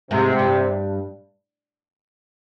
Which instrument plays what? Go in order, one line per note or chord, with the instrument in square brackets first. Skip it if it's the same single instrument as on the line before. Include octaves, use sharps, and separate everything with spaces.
[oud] G#2 G#3 [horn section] C3
[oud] G2 G3